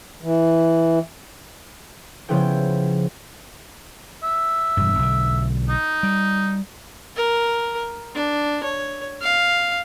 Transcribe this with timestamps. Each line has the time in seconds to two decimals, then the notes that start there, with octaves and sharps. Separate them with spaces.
0.23 E3
2.28 C#3 F3 B3 E4 G#4 G5
4.23 E5
4.77 E1 G2
4.99 B1 D3
5.69 D#4
6.03 G3
7.16 A#4
8.15 D4
8.63 C#5
9.21 F5